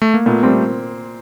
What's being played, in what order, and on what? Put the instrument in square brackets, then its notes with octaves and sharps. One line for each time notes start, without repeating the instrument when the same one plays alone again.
[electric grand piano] A3
A#3
[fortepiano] A#2 [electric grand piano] A3 B3
[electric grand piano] G3 A3 [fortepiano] C4